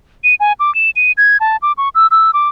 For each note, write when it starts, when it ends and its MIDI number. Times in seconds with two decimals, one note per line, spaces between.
0.24 0.35 99
0.40 0.53 80
0.60 0.73 86
0.75 0.90 100
0.96 1.12 99
1.17 1.37 92
1.40 1.57 81
1.62 1.72 86
1.78 1.89 85
1.95 2.07 88
2.11 2.31 88
2.34 2.49 86